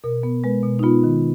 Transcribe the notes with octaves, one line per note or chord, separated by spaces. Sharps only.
B2 A#4
B3
G#3 B4
B2
D#4
B3 F4
D#3